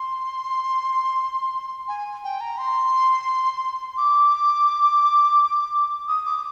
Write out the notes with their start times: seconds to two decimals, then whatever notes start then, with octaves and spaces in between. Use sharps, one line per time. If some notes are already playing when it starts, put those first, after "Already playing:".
Already playing: C6
1.88 G#5
2.24 G5
2.40 A#5
2.58 C6
3.97 D6
6.08 D#6
6.25 D6